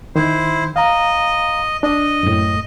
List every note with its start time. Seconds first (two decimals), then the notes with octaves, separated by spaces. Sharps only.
0.16 D#3 E4 C5
0.76 D#5 F5 A#5
1.83 D4 D#5
2.23 F#2 A2